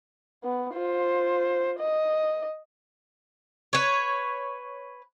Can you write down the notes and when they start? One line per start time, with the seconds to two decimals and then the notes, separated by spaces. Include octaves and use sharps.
0.44 B3
0.74 F4 C5
1.79 D#5
3.73 B4 C#5